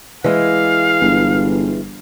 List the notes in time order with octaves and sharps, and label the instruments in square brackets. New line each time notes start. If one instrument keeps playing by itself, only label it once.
[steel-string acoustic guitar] E3 G#3 [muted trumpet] F5
[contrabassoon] G1